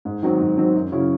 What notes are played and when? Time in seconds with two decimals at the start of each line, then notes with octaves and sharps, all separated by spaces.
0.05 G#2
0.22 D#3 F#3 C4
0.40 G#2
0.57 D#3 F#3 C4
0.74 F#2
0.92 C#3 F#3 C#4 E4